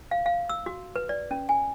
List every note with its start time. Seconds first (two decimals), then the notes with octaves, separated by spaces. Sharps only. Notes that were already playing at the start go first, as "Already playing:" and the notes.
0.11 F5
0.26 F5
0.49 E6
0.66 F#4
0.96 B4
1.09 D5
1.31 C#4
1.49 G#5